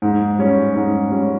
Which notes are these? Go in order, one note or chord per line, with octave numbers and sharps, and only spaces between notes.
G#2
G3 C#4
G#2
G3 C#4